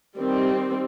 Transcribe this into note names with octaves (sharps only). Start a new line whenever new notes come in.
D#3 G3 C4